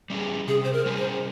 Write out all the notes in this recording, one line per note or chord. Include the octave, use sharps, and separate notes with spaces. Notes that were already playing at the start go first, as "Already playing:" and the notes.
G3 C#4 G#4
C3 G#4
C5
A#4
G3 C#4 G#4
C5